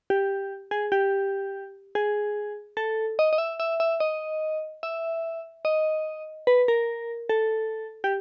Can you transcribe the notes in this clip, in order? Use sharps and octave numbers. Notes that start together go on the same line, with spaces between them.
G4
G#4
G4
G#4
A4
D#5
D#5
E5
E5
E5
D#5
E5
D#5
B4
A#4
A4
G4